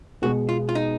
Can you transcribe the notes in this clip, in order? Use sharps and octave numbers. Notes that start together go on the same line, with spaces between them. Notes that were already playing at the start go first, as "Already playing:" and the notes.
B2 G#3 B3 F#4
F4
F4
D#4